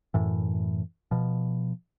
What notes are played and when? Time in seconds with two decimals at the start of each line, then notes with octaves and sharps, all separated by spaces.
0.14 F#2 A2 E3
1.11 B2 F3